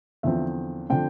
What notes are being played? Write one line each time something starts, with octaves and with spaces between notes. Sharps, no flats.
E2 D3 F3 C4 E5
D3 F3 C4 G5